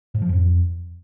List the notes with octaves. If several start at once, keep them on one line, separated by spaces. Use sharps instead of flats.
G#2
F3
F2